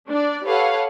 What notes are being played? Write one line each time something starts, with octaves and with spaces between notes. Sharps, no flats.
D4 D5
G4 A4 B4 C#5 F5 F#5